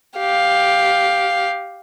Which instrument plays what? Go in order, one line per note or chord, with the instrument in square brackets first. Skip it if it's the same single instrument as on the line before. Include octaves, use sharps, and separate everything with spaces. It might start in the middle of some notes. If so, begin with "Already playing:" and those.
[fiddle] G4 F5